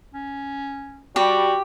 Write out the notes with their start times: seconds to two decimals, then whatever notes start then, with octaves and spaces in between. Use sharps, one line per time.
0.14 C#4
1.16 G3 F#4 G4